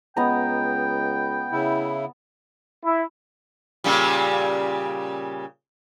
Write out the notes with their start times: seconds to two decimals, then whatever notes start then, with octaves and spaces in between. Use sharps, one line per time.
0.17 C#2 B3 D#5 G5 A#5
1.52 C#3 E4
2.83 E4
3.84 A#2 C#3 G3